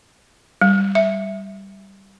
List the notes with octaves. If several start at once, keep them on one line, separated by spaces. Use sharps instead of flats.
G3
E5